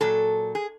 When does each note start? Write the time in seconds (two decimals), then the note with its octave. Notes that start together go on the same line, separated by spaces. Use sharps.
0.01 A#2 F#3 A4
0.55 G#4